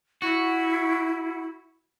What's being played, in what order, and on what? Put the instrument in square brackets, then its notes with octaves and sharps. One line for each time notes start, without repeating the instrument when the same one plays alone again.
[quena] E4 [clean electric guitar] F#4